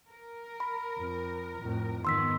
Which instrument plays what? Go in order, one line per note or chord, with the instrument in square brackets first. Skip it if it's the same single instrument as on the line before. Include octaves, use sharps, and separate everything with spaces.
[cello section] A#4
[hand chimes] B5
[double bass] F2
F2 A2
[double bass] G#2 [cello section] D#3 B3 [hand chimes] C6 E6 B6